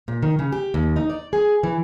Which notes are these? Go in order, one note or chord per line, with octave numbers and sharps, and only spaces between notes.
A#2
D#3
C#3
G4
D#2
D#4
D5
G#4
E3